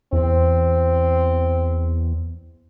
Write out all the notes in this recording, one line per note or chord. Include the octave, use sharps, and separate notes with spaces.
E2 C4